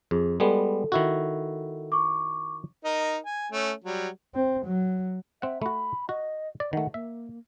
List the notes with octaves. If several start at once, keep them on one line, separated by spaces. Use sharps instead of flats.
F2 G#4
G3 G#3 B3 A4
D#3 E4 F#4
C#6 D6
D#4 A#4 D#5
G#5
A3 C#4
F#3 G3
C4
F#3
C4 E5 F#5
A3 F#4 B5
F#4 D#5
D5
D#3 A3 F#5
A#3 E5